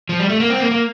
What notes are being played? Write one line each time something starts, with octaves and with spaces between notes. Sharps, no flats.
F3
G3
A3
A#3
C4
A#3
A#3